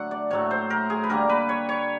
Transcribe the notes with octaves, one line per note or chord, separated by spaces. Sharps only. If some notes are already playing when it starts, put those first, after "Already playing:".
Already playing: D3 F#3 A3 F#5
D5
A2 F#3 A3 C#5
C5
A#4
G#4
B4
D3 G3 A#3 A#4
B4
C#5
C#5